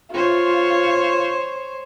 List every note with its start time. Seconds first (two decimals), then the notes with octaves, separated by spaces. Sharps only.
0.14 F4 C5 C#5